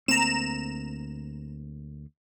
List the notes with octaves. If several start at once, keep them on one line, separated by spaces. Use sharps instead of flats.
D2 A#3 C4 A#5 E7